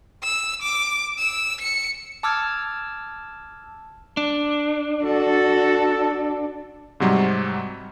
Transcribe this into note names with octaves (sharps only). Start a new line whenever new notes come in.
E6
D6
E6
C#7
A5 D6 E6 F6 G#6
D4
F#4 A4
G#2 C3 F#3 G3